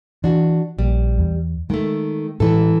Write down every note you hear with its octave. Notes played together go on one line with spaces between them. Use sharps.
E3 D4 F#4
A#1 G3
E2
D#3 G#3 A3
A2 E3 G#3 A4